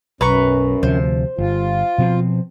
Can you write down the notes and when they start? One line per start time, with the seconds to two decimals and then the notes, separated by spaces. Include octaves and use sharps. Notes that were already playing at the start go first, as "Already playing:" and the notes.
0.21 B1 F#2 B4 A#5 C#6
0.83 D2 C3 F3 C5
1.38 G1 F4
1.98 B2 F3 C4